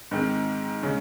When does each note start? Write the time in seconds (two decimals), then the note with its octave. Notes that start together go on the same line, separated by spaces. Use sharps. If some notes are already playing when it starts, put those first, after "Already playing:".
0.11 G#2 D#3 G#3 C4
0.83 C#3 G#3 C#4